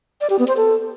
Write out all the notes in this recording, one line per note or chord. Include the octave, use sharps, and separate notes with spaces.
D5
G4
B3
C5
A4